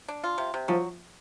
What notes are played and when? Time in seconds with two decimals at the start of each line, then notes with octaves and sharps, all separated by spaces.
0.08 D4
0.24 F4
0.38 C3
0.54 C3
0.68 F3 F#3